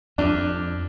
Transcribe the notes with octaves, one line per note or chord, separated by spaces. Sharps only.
F2 D4